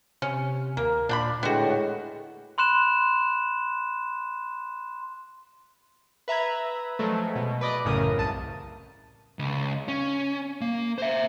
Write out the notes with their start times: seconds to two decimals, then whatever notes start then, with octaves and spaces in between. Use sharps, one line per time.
0.22 C3 C#4
0.77 D#2 A#3 A#4
1.09 A#2 D4 D5 G5 B5
1.43 A2 D3 G#3 A3 B3 F#4 G5
2.58 B5 C6 F#6 E7
6.28 B4 E5 A#5 B5 G#6
6.99 F3 F#3 G#3 A3
7.35 B2
7.61 B4 D5 D#5 D6
7.85 A1 F#2 A2 C#3 A#4 D#6
8.18 C2 A5 D#6
9.39 C#2
9.88 C#4
10.61 A#3
10.98 C5 E5